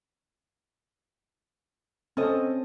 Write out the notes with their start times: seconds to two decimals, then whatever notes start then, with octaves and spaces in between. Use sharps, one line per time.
2.17 C4 C#4 A4 D#5